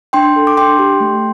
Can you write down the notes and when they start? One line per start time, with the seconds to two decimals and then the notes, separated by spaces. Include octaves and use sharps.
0.13 D4 G5 C6
0.36 A4
0.47 D6
0.57 D4 G5 C6
0.79 G4
1.00 A3